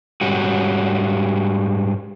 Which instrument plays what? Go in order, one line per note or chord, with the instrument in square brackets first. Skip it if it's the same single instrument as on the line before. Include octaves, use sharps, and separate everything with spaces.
[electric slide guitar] G#2 G3 C#4 F#4